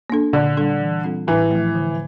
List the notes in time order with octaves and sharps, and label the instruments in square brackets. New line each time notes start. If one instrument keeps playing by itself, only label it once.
[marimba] A#3 D4 A4
[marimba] A#2 [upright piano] D3
[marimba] G3 D4 A4
E3
G3 C4 F4 A4
[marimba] A2 [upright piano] E3
[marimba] F3 A3
D3